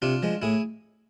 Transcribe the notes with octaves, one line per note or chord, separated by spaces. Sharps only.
C3 D4 F4
F3 G#3
A2 E4 G#4